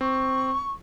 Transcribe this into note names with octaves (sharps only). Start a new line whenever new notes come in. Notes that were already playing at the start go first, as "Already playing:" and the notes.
C4 C#6